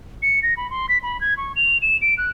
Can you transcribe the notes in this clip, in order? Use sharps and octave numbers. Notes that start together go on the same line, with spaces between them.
C#7
A#6
B5
C6
B6
B5
G#6
C#6
F7
E7
D7
F#6